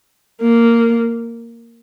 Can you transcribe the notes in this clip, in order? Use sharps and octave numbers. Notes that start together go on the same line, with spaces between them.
A#3